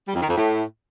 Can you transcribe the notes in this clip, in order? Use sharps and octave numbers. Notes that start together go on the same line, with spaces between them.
G3
F2
D#3
F2
A2